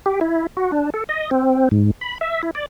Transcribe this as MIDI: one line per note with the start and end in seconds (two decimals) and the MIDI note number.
0.06 0.20 67
0.21 0.47 64
0.57 0.71 66
0.72 0.90 62
0.94 1.04 69
1.09 1.30 75
1.31 1.69 60
1.71 1.91 44
2.01 2.18 83
2.21 2.41 76
2.43 2.51 64
2.55 2.66 74